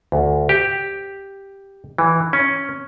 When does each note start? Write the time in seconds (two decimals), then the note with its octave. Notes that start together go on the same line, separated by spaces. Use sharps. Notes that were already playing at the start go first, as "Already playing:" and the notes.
0.12 D2
0.49 G4
1.98 E3
2.33 C#4